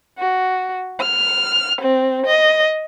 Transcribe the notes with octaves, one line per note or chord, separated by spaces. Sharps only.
F#4
F6
C4
D#5